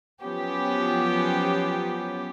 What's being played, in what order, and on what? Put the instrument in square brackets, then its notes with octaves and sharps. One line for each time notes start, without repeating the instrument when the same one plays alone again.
[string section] F3 F#3 B3 C#4 G4